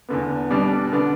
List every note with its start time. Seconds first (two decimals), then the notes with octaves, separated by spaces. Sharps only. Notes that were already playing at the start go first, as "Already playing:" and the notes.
0.09 E2 D3 B3
0.50 B2 G3 D4
0.92 D3 B3 D4